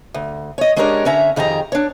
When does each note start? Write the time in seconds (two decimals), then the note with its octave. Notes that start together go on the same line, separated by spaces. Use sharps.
0.14 D2
0.58 C#5 D#5
0.76 G#3 C#4 D4 G4 A#4 C#5
1.05 D3 C#4 E5 A#5
1.36 F2 D#3 G4 G#4 A5 A#5
1.72 D4 C#5